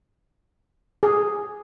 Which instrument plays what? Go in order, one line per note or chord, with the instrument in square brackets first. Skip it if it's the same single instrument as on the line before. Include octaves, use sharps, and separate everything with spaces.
[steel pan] G#4